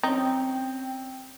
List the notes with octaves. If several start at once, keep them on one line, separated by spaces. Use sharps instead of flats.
C4 C#4 D#4 G5